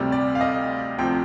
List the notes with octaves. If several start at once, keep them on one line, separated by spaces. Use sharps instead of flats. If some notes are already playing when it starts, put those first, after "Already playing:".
Already playing: D2 C3 G3 D5
D5
F5
D#5
D2 C3 F3 G5